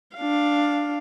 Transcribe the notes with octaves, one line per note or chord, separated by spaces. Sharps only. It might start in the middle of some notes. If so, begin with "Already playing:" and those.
D4 F5